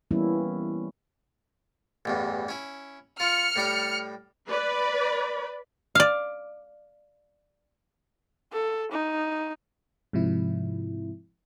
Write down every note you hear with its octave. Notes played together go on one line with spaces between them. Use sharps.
E3 G3 A#3 B3 C#4 E4
A1 E2 G2
C#4 E4
F4 F6 C#7
A2 G3 G5
B4 D5 B5
D5 F5
A4
D#4
G#2 C3 F3 E4